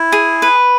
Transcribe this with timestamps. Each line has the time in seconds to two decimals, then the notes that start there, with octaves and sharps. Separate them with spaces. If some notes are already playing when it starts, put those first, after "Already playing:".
Already playing: E4
0.12 G#4
0.42 B4